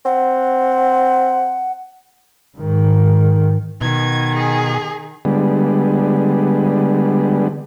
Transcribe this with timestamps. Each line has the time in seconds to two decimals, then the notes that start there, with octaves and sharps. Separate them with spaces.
0.05 C4 F#5
2.58 G#2 D#3
3.81 B2 D#3 G#6
4.35 G#4
5.25 D3 G3 G#3 B3